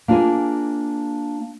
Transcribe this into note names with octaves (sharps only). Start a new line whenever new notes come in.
A#3 D4 F4 G#4 G#5